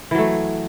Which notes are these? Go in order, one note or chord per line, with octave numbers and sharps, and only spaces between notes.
E3 F#3 A3